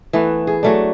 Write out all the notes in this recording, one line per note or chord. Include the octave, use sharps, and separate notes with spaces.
E3 A3 B3
G#4
F#3 A3 D4